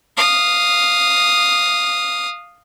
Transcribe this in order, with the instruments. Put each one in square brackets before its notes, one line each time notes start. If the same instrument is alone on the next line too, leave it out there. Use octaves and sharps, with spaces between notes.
[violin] F5 D#6